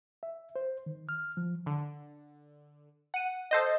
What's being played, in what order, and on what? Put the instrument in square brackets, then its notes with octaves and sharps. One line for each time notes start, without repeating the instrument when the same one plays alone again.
[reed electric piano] E5
C5
D#3
F6
F3
[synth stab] D3
F#5 D#7
A4 C5 D#5